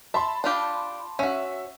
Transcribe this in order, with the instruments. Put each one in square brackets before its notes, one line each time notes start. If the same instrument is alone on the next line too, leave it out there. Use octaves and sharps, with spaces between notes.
[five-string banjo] E5 [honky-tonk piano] A5 B5 C6
[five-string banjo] D4 F4 G4
[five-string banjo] C#4 F#4 [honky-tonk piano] E5